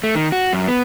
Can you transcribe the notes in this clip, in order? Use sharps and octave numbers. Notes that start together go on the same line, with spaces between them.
A3
D#3
F#4
F#2
B3